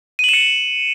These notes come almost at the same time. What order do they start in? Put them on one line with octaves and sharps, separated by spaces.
D#7 F#7 E7 C#7